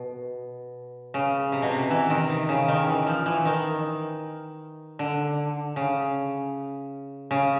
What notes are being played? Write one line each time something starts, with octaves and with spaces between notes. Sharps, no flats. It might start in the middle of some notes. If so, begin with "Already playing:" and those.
Already playing: B2
C#3
C3
B2
C3
E3
D#3
C3
C#3
D#3
E3
F3
E3
D#3
D3
C#3
C#3